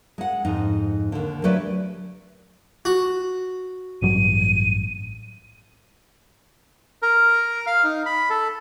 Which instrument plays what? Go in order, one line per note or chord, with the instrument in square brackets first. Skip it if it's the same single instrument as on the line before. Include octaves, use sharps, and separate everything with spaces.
[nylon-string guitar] G#3 F#5
F2 G#2 D#4
D#2 D3
F#3 A3 C#4 G4 B4 D5
[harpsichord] F#4
[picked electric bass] A1 G2 F#3 [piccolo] D#7
[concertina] A#4
F5
D#4
B5
A4